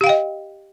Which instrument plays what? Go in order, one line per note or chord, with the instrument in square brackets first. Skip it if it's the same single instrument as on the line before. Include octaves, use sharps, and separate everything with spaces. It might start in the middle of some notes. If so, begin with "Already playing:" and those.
[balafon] G4
F5
G5
D#5